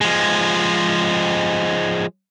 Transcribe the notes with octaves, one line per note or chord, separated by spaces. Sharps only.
F3 G#3